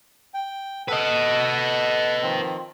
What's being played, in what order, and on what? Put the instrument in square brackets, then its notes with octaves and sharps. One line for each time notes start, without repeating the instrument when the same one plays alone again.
[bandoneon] G5
[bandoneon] A4 F#5 [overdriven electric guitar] B4 D#5
[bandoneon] D#3 F3 C4